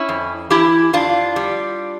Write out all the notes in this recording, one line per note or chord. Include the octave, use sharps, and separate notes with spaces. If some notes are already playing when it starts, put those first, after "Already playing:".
Already playing: C#4 E4
F2
E3 E4 G4
F2 D4 F4
G3